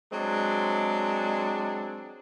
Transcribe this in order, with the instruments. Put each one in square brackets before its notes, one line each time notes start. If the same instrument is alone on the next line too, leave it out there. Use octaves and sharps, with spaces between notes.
[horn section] F#3 G#3 C4 D4